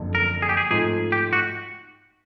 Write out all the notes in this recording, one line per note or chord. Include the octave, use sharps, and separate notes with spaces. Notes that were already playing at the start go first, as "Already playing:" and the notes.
Already playing: F#1 F2 D3
A#4
G#4
G4
G#4
G#2 F3 A3 C4 F4 G#4
G4
F#4